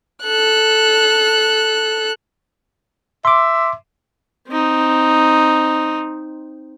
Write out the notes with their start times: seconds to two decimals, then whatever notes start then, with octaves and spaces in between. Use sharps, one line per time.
0.24 A4 F#6
3.25 E5 C6 D6
4.48 C4 D#4